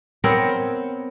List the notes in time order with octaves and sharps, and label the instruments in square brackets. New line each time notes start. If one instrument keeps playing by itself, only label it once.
[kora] B3 C4 A#4 C#5